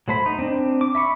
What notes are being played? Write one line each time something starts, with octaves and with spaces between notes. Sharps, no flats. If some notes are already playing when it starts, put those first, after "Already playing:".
F#3 A3 C5 B5
D#4
C4 D4
D6
E5 B5 C#6